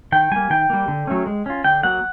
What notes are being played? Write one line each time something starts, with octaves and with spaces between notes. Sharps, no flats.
D#3 G5
G3 A#3 G#5
D#3 G5
G3 A#3
D3
F#3 A3 C#4
G#3
C#4 F4
D3 G5
F#3 A#3 F#5